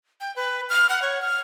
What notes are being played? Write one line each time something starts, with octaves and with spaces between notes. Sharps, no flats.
G5
B4
F6
F#5
C#5
F6